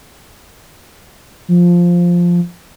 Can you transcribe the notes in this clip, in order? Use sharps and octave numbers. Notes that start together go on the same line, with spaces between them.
F3